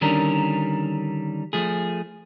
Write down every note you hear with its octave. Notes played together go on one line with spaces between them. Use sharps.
D3 D#3 G3 C#4 D4 A#4
F3 A3 G#4